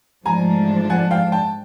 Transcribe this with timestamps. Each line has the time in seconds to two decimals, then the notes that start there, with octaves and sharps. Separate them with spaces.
0.26 G#2 F3 A3 D4 G#5 A#5
0.90 F#5 G#5
1.11 F5 G5
1.32 G5 A5